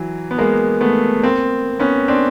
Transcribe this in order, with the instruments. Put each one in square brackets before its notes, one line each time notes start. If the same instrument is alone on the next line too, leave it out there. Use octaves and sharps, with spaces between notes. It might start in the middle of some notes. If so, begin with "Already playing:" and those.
Already playing: [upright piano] E3 F#3
B3
G#3 A#3
A3 B3
A#3 C4
B3 C#4
C4 D4